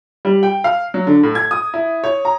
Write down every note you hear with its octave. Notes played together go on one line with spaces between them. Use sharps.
G3
G5
F5
F#3
D3
A2
G#6
D#6
E4
C#5
A#5